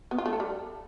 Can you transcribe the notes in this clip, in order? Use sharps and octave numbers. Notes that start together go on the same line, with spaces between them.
B3
F4
A3
A4
G3